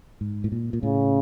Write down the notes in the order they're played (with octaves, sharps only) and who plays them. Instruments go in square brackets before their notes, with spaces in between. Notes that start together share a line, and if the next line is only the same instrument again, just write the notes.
[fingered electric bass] G#2
A2
A#2
A#2
[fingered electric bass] A2 [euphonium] C#3